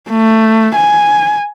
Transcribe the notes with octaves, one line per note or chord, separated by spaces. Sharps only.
A3
G#5